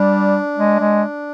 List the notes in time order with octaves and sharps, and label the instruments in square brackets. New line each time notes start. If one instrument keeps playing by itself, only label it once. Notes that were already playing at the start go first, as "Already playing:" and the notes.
Already playing: [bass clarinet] G3 [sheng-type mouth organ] D4
[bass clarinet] G#3
G#3